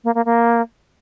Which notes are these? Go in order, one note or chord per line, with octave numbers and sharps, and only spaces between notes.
A#3
A#3
A#3